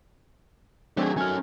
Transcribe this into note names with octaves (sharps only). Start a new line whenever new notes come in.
D#3 F#3 A3 C4 D4 G4 G#4
C#4 F#4 G#5 F6